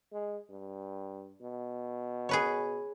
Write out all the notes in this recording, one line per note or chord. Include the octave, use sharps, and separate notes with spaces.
G#3
G2
B2
G#4 B4 C#5